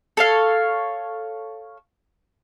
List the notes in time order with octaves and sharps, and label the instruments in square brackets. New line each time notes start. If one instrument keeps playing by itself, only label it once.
[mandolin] A4 C#5 F5